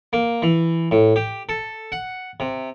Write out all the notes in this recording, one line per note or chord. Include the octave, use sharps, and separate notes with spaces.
A#3
E3
A2
G4
A4
F#5
C3